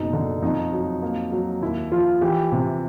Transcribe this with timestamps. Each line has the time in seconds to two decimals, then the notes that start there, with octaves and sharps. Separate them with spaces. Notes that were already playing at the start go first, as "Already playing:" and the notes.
Already playing: F#1 B2 D#4
0.13 D3
0.42 F2 D#4
0.72 F#3
1.03 A#3
1.32 F#3
1.62 D#2 E4
1.92 F3 F4
2.21 E3 G4
2.52 C3